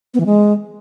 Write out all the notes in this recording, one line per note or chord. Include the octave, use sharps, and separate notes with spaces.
B3
E3
G#3